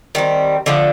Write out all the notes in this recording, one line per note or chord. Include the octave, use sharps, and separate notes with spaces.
D#3 G3 C4
D3 F3 A3